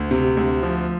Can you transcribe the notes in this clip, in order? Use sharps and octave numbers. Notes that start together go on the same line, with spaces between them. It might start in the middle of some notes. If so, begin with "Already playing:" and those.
Already playing: D2
C3
D2
F3